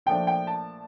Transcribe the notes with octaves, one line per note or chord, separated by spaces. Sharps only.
A#2 F3 A3 D4 G5
G5
A5